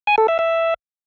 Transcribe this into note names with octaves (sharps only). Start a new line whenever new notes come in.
G#5
A4
E5
E5